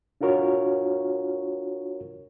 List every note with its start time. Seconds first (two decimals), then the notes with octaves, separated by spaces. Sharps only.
0.21 D4 F4 F#4 A#4 C#5